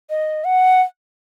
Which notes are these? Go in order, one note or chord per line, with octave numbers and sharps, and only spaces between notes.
D#5
F#5